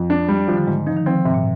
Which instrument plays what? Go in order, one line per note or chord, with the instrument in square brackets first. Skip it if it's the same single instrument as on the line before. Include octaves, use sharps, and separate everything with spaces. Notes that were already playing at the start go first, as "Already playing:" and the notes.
Already playing: [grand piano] F2
D4
G3
[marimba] D#3 [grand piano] F3
[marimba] D3
[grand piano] G#2 [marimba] G#3
[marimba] F3 [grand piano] D#4
[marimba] D#3
[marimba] F3 [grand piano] C4
[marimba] G#2 [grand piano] C3
[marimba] A#2